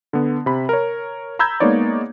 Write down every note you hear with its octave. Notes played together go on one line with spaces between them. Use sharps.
D3 B3
C3 B5
A#4 C#5
A#5 B5 E6 G6 G#6
G#3 A#3 B3 D#4 C#5 D5